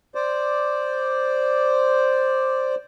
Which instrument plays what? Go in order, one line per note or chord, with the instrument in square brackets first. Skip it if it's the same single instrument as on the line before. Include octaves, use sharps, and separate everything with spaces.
[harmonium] C5 D5